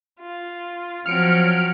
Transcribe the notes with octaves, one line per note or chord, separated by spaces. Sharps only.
F4
F3 F#3 C4 F6 C#7 D7